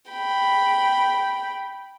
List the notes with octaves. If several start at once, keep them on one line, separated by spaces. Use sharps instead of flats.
G5 B5